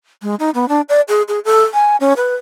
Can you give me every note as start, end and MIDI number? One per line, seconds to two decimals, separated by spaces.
0.22 0.35 56
0.39 0.50 63
0.54 0.68 59
0.68 0.81 62
0.89 1.01 74
1.09 1.22 68
1.28 1.39 68
1.45 1.63 69
1.74 1.96 80
2.00 2.13 61
2.17 2.35 71